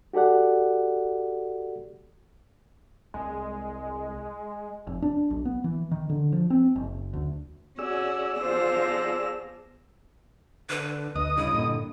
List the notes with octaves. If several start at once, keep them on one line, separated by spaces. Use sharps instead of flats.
F#4 G4 A4 D5 F#5
C2 G#3
F1
D4
B1
B3
E3
D#3
D3
F3
C4
F#1
D2
C#4 F#4 G#4 D5 E6
F3 B3 F4 C5 A#6
D3 B4
D2 D#5 D#6
G2 C#3 E4
G2 A#2 D3